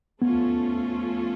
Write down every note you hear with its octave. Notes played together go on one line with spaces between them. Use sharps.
F3 A3 B3 C#4 F4 A4